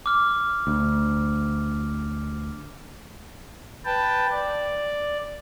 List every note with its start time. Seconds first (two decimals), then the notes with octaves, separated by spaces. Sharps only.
0.06 D6 F6
0.67 D2
3.86 B4 G5 A5
4.31 D5